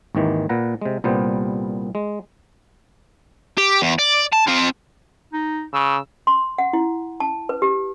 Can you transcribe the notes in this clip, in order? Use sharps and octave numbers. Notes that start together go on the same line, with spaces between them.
G#1 D#2 D#3 E3
A#2 B4 F#5 A#5
C3 G#3
C2 A#2 G3 B3 C5
G#3
G4
E2
D5
A5
C4 F4
D#4
C#3 E6
C6
F#5
E4
A5
B4
G4